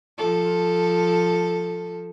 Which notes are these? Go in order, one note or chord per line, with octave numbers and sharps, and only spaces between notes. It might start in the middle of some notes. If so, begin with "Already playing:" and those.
F3 A4